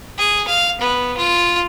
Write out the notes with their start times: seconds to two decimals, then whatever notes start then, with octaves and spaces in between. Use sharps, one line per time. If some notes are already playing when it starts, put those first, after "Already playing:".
0.18 G#4
0.48 F5
0.81 B3
1.17 F4